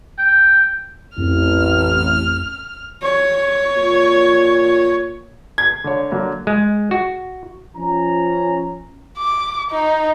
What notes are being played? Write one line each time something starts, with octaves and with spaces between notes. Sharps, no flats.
G5
A1 F2 C4 F6
C#5
A#2
G#6
D3 C#5
D3 F#3 A#3
G#3
F#4
F3 C#4 A#5
D6
D#4